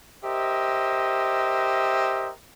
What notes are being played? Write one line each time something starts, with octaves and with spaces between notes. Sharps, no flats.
G4 A#4 C5 D#5 E5